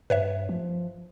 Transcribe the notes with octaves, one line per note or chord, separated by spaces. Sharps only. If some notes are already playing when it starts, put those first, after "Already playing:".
G2 B4 C#5 E5
F3